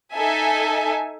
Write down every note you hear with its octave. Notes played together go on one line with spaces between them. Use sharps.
D#4 A4 E5 G#5